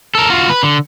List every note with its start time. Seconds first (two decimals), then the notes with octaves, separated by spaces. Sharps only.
0.15 A4 A#4
0.30 F4 F#4
0.49 B4
0.63 D3